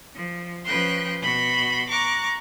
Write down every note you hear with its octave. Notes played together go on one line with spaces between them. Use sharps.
F3
F3 C#4 B4 G5 C6 F#6
B2 F#4 B5 C6
A#5 C#6 D6 F#6